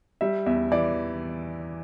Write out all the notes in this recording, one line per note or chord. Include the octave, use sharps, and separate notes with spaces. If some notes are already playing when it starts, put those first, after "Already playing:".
G3 E5
E2 E5
E3 D5